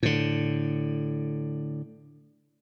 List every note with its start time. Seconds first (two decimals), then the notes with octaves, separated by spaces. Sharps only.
0.03 A2 D3